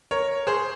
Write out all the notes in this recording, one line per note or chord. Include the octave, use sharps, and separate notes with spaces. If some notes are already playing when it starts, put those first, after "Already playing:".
A#4 C#5
G#4 C5